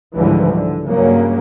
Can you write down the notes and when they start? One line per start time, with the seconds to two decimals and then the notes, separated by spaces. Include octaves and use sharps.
0.15 C#2 G#2 D3 E3 F3 G3
0.51 D3
0.87 G2 C#3 F#3 A#3